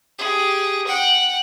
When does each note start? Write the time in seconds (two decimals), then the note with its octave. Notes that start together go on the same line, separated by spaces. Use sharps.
0.18 G4 G#4
0.87 F#5 G5